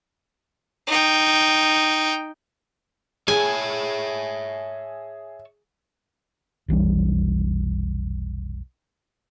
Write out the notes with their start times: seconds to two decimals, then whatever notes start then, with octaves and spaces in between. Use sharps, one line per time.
0.87 D#4 G5
3.28 G#4 C#5 E5 G#5 A5
6.68 F1 B1 E3 G3